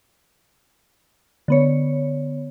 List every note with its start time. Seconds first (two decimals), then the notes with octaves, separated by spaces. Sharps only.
1.48 D3 B3 C#5